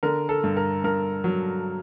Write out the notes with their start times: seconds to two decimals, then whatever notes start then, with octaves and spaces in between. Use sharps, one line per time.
0.03 D3 A#4
0.29 A4
0.44 G2
0.57 A#4
0.84 G2 A#4
1.24 F#3